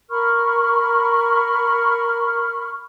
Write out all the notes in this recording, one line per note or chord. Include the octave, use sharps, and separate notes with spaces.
A#4 B5 C#6 F6